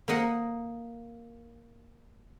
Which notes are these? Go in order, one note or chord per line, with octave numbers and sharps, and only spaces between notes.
A#3 A#4 D#5 F#5